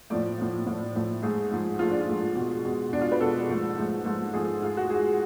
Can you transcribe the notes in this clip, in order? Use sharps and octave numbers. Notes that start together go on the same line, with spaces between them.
A2 F3 A3 D5
A2 F3 A3
A2 F3 A3
A2 F3 A3
G#2 F3 A3 G#4
G#2 F3 A3
G#2 F3 A3 F4
D4
F4
G#2 F3 A3
B2 G#3
B2 G#3
B2 G#3 D4
F4
B4
B2 G#3 A4
G#2 F3 A3
G#2 F3 A3
G#2 F3 A3
G#2 F3 A3 G#4
G#2 G#3 F4
F#4
G#2 G#3 G#4